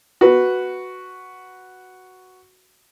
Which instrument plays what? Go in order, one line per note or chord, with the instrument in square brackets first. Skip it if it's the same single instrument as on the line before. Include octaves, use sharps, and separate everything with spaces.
[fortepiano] F#4 B4